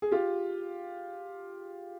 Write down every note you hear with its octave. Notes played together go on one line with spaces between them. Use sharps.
G#4
F4 G4